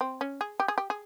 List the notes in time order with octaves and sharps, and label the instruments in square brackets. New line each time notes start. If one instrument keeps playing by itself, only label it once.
[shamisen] C4
C#4
G#4
G4
G#4
G4
G#4